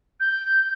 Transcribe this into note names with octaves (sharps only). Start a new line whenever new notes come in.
G6